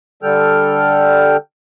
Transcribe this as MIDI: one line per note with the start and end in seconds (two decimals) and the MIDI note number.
0.23 1.37 50
0.23 1.37 55
0.23 1.37 69
0.23 1.37 79
0.23 1.37 89